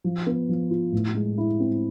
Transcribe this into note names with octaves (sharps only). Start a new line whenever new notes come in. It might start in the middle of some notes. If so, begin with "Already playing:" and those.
F3
B3
F3
F4
A2
G#3
E4
C4